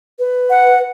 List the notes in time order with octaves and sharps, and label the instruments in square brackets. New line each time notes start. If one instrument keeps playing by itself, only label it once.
[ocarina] B4
[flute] F#5